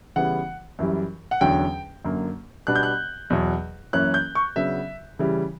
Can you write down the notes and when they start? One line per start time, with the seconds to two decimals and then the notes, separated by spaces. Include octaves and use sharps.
0.16 C#3 E3 G3 B3 F#5
0.79 F#2 E3 G3
1.31 F#5
1.41 E2 D3 F#3 C#4 G5
2.04 F#2 D3 A#3
2.67 B2 G3 B3 D4 F#6
2.76 G6
2.83 F#6
3.30 E2 B2 F#3
3.93 F#2 E3 A#3 C#4 F#6
4.14 G6
4.35 C#6
4.56 C#3 F#3 B3 D4 E5
5.19 C#3 E3 G3